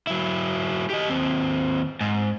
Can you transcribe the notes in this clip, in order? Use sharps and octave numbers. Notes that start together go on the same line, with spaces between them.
F#3 E4
G4 D#5
D#2 C4
G#2